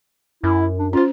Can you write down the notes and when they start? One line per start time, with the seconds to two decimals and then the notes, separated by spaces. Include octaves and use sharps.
0.43 F#2 E4
0.79 D4
0.93 C#4 F4 C5